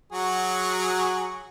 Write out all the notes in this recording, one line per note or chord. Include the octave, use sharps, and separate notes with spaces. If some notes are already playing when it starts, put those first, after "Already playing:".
F#3 F#4 G#4